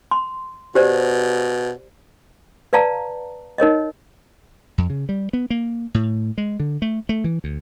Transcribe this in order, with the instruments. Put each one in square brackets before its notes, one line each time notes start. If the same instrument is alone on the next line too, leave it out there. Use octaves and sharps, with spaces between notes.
[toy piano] C6
[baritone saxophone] B2 [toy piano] G4 C5 D5
[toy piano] B4 D5 F5 A5 A#5
D#4 A#4 C#5 D#5
[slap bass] F2
C#3
G3
B3
A#3
A2
G#3
D3
A3
A3
E3
D2